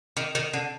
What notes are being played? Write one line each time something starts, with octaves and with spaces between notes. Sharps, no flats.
D#3
D#3
D3